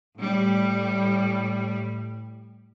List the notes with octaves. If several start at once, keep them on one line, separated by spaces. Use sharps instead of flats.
A2 G3